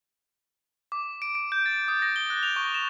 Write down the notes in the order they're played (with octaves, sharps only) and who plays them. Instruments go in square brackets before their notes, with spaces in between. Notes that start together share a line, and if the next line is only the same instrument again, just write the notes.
[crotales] D6
D7
D7
G6
A6
D#6
A#6
G7
F#6
F7
C#6
E7